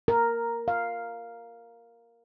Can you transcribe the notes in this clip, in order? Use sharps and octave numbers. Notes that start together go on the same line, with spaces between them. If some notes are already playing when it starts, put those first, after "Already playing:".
A#4
F5